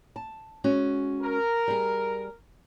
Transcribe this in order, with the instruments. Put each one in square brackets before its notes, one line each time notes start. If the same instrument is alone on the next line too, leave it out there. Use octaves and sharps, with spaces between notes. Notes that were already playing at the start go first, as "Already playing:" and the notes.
[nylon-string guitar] A5
G#3 C#4 F#4
[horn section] A#4
[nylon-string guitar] G3 G#4